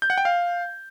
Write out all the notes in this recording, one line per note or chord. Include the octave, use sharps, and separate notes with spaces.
G6
F#5
G5
F5